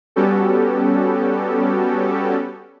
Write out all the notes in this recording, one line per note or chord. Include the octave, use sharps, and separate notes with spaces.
G3 B3 C#4 F#4 G4 A4